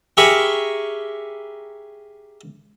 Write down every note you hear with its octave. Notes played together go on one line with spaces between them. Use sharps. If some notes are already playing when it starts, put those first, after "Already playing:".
G4 G#4 A#4 E5 B5 C#6